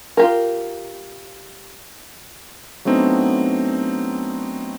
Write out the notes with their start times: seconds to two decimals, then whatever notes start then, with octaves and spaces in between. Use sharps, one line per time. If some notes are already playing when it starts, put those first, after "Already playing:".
0.17 F4 G4 A#4
2.85 F#3 A3 B3 C4 D4 D#4